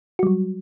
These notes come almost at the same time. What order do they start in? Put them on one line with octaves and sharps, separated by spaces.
F#4 G3 F#3